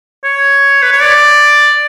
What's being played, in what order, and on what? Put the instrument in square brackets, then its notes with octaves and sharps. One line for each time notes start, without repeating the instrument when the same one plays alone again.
[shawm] C#5
B4
C#5
D5